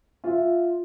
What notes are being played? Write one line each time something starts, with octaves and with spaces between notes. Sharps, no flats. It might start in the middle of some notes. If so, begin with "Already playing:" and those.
F4 E5